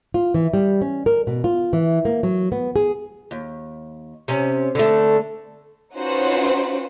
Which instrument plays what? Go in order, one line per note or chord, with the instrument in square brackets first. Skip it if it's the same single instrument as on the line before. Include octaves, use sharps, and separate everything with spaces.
[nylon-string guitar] F4
E3
G3
C#4
A#4
B2
F4
E3
A#3
F#3
B3
G#4
[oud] D#2
C3 C#4
D3 A3
[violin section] C#4 D#4 F4 F#4 B4 C5